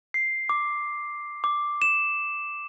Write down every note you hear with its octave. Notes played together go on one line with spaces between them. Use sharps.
C7
D6
D6
E7